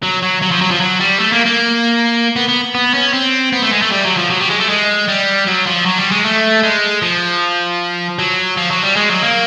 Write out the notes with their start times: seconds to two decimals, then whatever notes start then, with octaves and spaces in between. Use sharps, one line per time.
0.03 F#3
0.23 F#3
0.42 F#3
0.51 F3
0.61 F#3
0.71 F3
0.80 F#3
1.00 G3
1.19 A3
1.32 A#3
1.45 A#3
2.36 B3
2.49 B3
2.75 B3
2.94 C#4
3.13 C4
3.53 B3
3.62 A3
3.72 G#3
3.82 A3
3.91 G3
4.04 F#3
4.17 F3
4.30 F#3
4.40 G3
4.50 G#3
4.60 A3
4.69 G#3
5.08 G3
5.47 F#3
5.66 F3
5.86 F#3
5.98 G3
6.11 G#3
6.25 A3
6.63 G#3
7.02 F3
8.19 F#3
8.57 F3
8.71 F#3
8.83 G3
8.96 G#3
9.10 F#3
9.22 A#3